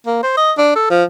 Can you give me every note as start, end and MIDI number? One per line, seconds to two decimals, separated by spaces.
0.06 0.19 58
0.23 0.35 72
0.37 0.52 75
0.58 0.73 62
0.75 0.90 69
0.90 1.04 53